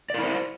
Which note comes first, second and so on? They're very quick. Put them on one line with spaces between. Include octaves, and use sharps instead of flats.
D5 A#4 E4 C5